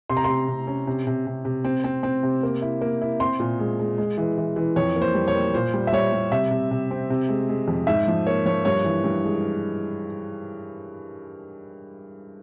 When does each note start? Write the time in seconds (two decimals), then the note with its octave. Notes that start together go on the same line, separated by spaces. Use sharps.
0.10 C3 C6
0.17 A#5
0.24 C3 C6
0.48 C3
0.67 C#4
0.87 C3
1.07 C3
1.26 C3
1.45 C3
1.65 C4
1.84 C4
2.03 C4
2.23 C3
2.43 A#3
2.62 E4
2.81 A#3
3.02 E4
3.20 C4 C6
3.40 A#2
3.59 G#3
3.79 G#3
3.98 G#3
4.17 E3
4.38 E3
4.56 E3
4.76 F2 C#5
4.96 A#3
5.02 C5
5.14 G3
5.28 C#5
5.35 A#3
5.54 A#2 C5
5.74 G3
5.87 E5
5.93 G3 C#5
6.13 G3
6.31 C3 E5
6.51 C3
6.71 C3
6.91 C4
7.10 C3
7.29 G#3
7.49 G#3
7.68 F2
7.87 G#2 E5
8.08 F3
8.27 A#3 C#5
8.46 F3 C#5
8.65 G2 C#5
8.84 E3
9.04 G2
9.24 G#3